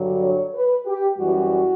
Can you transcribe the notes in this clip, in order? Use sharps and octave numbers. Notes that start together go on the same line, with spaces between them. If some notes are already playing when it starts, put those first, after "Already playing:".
Already playing: G2 D3 F#3
C#5
B4
G4
F#2 E3 G3 F#4